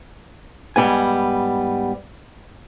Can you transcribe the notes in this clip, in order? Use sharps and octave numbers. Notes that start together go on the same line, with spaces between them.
G#2 G3 B3 G#5